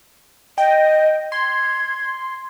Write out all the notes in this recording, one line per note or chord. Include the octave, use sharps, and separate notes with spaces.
D#5 G5
C6 G#6